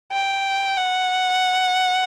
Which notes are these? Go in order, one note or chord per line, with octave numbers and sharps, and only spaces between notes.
G5
F#5